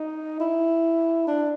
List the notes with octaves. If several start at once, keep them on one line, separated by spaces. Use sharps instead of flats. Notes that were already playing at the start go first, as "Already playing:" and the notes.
Already playing: D#4
E4
D4